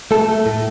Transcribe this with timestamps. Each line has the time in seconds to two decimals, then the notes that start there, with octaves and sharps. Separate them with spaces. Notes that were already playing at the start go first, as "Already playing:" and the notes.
0.11 A3 A4
0.29 A3
0.46 A2